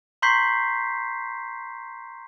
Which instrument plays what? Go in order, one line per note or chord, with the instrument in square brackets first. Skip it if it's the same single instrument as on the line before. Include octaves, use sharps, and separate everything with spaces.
[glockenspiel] A#5 C6 C#6 G6 B6 C7